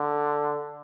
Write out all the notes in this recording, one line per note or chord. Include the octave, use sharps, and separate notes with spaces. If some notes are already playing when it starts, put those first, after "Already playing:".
Already playing: D3